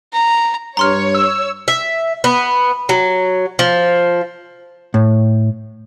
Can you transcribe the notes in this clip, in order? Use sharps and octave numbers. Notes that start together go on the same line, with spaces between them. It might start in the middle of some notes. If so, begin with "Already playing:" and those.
A#5
G2 C#5 A#5 C6 F6
E6
E5
B3
F#3
F3
A2